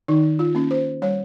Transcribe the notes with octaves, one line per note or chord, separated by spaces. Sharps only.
D#3 D#4
F4
A#3 C#4
C5
G3 C#5